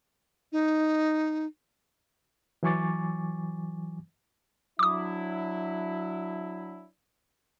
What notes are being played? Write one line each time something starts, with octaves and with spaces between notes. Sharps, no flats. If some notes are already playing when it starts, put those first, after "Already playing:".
D#4
E3 F#3 G#5 C#6 D6 A6
F#3 D4 E4 D6 D#6